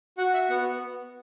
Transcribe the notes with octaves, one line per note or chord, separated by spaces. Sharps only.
F#4 F#5
E5
B3 F#5